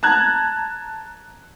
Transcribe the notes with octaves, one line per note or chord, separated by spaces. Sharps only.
A5 A#5 F#6 G#6